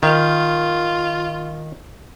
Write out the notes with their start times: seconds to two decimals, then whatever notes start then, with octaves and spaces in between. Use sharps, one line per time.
0.03 D#3 F4